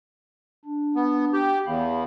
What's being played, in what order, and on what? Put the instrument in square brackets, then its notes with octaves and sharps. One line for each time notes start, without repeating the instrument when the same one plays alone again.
[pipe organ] D4
[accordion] B3
G4
[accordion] E2 [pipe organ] F5 B5